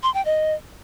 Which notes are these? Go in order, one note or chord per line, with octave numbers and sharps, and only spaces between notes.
C6
G5
D#5